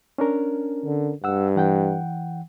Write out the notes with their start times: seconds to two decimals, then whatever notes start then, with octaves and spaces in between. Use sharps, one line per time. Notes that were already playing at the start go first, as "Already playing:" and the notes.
0.18 C#4 D4 A#4
0.84 D3
1.24 G2 F#5 E6
1.56 E3 F#5 G5